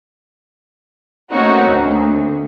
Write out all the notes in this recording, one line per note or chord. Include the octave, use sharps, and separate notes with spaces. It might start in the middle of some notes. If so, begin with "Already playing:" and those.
A3 A#3 C4 C#4 D#4 F#4
D2